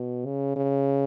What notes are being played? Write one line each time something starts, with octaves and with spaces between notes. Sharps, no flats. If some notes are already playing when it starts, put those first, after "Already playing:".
Already playing: B2
C#3
C#3